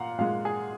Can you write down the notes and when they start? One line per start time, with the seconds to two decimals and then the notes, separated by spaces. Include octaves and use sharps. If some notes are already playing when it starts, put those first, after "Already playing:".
Already playing: A#2 F5 F#5 A#5
0.18 A#2 G#3 F5
0.45 G#4